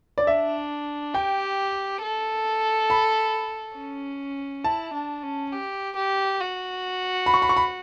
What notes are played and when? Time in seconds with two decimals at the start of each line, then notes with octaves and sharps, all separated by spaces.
0.18 D5
0.27 D4 E5
1.14 G4 G5
2.02 A4
2.90 B5
3.77 C#4
4.64 E4 A5
4.94 D4
5.23 C#4
5.52 G4
5.96 G4
6.40 F#4
7.26 B5
7.34 C#6
7.42 B5
7.49 C#6
7.57 B5